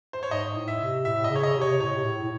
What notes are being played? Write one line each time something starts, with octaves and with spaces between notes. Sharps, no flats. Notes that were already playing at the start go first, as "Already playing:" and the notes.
C5
C#5
G#2 D#5
A2
E5
C3
A2 E5
D#5
C#3
C#5
D#5
C3
C#5
A2 C#5
C3
A2
A2